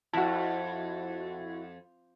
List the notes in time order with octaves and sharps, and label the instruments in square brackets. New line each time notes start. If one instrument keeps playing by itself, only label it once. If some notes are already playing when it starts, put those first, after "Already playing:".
[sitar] F2 [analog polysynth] E4 F#4 [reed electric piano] F#5 A5